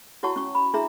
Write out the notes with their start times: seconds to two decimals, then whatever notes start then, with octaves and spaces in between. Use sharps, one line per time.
0.23 E4 F#4 C#5 F#5 A5 C#6
0.36 C#4 C#6
0.55 B5
0.74 D4 E4 G#4 E5 A#5